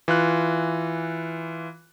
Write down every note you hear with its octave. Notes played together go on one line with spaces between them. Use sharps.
E3 F4 F#6